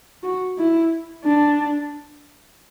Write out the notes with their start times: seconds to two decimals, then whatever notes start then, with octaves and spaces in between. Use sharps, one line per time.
0.23 F#4
0.58 E4
1.25 D4